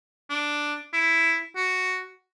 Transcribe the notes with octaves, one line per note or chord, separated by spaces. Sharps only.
D4
E4
F#4